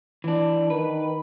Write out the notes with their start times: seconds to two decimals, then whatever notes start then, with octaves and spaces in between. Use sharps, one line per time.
0.24 E3 D4
0.70 D#3 B4